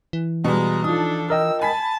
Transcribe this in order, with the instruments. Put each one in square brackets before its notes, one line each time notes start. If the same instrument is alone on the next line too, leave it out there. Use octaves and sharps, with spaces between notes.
[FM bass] E3
[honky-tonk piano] B2 G3 [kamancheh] G#3 A#5
[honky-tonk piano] F3 D#6 [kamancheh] D4 A4 [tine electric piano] D#4
[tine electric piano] A#4 D#5 G5 [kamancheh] E6
[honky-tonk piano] G#5 B5 B6 [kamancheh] A5